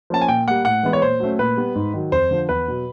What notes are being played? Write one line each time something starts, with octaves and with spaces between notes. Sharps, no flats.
F3 A#3 C#4 A5
G#5
A#2 G5
G3 A#3 F#5
A2 F#5
E3 G#3 B3
C#5
A#2 C5
F#3 A3 C#4
A#2 B4
G3 B3
G#2
D#3 F#3
F2 C5
D3 F3
E2 B4
B2 F#3